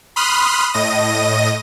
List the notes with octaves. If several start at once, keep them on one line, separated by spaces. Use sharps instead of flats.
B5 C6 D#6 F6 F#6
A2 D#5 A#6 D#7